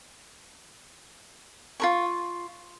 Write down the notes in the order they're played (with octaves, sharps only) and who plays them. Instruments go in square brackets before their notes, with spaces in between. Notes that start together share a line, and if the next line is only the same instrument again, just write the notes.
[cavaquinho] F4 A#4 C#6